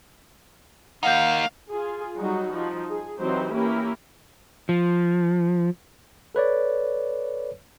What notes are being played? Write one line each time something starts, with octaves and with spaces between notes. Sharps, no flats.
A#3 D#4 F5 F#5 A#5 G6
F4 G#4
F#3 G3 D#4 F#4
F3 D#4
G#4
E3 F#3 C4 D#4 G4 C5
A#3 C#4 E4 G4 A#4
F3
A4 B4 C#5 D5